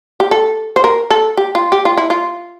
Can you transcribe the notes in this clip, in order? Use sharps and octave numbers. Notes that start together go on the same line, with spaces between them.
G4
A4
C5
A#4
A4
G4
F4
G4
F4
E4
F4